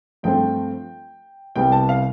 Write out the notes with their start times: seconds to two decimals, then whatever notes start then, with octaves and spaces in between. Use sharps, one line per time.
0.23 G2 F3 A3 C4 G5
1.56 C2 C3 G3 B3 G5
1.72 A5
1.89 F5